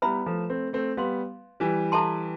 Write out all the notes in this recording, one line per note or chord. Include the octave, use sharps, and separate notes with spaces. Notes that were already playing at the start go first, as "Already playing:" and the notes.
G3 B3 E4 B4 E5 B5
F3 A3
A3 C4
A3 C4
G3 B3 B4 F5 C6
E3 G3
E4 A4 E5 A5 C6